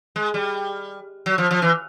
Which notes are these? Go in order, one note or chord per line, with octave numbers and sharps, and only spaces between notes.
G#3
G3
F#3
F3
F3
E3